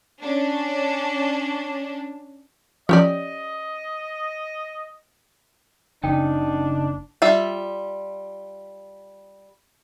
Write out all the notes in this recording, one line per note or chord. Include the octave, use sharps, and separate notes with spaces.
C#4 D4
F3 C#4 G4 D5 D#5
F#1 C#3 D4 D#4 G5
G3 F4 E5